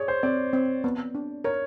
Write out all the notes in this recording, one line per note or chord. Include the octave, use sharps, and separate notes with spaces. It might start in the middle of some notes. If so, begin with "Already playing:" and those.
Already playing: G#4 C#5 D5
C5
C4 D5
C4
B3
D4
A#4 C#5